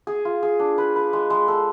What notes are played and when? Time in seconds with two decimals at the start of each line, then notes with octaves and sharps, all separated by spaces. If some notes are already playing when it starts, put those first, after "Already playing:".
0.07 G#4
0.25 F4
0.43 G#4
0.59 D4
0.78 B4
0.96 B4
1.13 G#3
1.30 G#3
1.48 A4